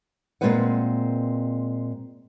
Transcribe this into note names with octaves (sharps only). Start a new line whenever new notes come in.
A#2 F#3 G#3 C4 B4 F#5